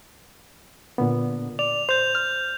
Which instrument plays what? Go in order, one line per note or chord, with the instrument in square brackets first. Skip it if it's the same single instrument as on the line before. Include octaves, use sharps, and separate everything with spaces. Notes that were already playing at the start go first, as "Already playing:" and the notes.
[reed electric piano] A#2 D3 B3
[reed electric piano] D5 [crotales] F7
[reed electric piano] C5 [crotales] G6 F7
[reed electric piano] F6